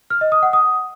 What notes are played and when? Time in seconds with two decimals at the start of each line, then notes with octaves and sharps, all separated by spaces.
0.10 F6
0.21 D#5
0.32 D#6
0.43 F#5
0.53 D#6